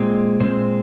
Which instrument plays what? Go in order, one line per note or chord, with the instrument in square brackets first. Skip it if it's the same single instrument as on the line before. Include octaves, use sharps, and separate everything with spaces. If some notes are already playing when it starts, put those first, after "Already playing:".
Already playing: [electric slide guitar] A#2 G#3 C4
A#2 G#3 C4 C5